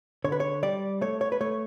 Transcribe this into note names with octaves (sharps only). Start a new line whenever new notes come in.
D3 C#5
B4
C#5
G3 D5
A3 C#5
C#5
B4
A3 C#5